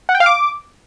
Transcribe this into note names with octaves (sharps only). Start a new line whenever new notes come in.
F#5
G5
F5
D6